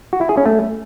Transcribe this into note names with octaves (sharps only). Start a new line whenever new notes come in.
F#4
E4
G#4
C#4
A3